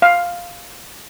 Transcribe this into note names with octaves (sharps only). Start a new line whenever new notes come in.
F5